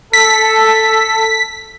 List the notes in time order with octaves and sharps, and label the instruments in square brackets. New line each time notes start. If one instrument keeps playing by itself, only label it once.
[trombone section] A4 [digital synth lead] B6